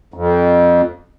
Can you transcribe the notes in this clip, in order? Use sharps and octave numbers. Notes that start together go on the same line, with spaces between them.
F2